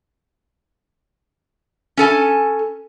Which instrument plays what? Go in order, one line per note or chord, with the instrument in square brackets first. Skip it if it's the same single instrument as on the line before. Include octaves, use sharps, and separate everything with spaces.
[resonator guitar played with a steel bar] C#4 A4 G#5